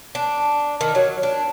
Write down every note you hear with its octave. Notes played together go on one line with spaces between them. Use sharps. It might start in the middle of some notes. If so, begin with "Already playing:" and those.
D4
D#3
F#3
D4